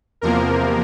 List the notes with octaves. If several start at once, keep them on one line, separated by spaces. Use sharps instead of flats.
E2 C3 F3 A#3 A#4